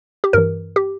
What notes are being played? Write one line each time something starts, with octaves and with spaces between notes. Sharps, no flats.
G4
G2 E3 A#4
G4